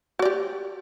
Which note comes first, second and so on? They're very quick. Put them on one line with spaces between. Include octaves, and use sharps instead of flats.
F#4 D5 G4